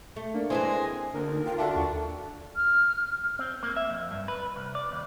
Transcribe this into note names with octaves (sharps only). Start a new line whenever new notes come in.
A3
A#3 D4
E3 G#3 C4 G#4 C5 G#5
A#6
D2 D3 A#3 A#4
D#4
F4 G5
D4 F#4 A4 E5 A5
D#2 C#6
F6
C4
A#3
E5
F2
G2
B4
C2
D5
D#2